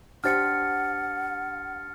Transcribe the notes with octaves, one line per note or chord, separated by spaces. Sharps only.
D4 G4 C5 F#5 F6 A6 C#7